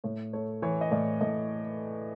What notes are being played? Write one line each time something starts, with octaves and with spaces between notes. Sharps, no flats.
A2 C#5
A3 C#5
E3 C#5
D#5
A2 D5
A2 D#5